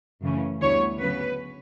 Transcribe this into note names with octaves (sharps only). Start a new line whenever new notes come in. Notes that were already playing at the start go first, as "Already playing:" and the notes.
F#2 C#3 E3 A3 C#4
D2 D3 G3 B3 E4 C#5
C#3 F#3 B3 B4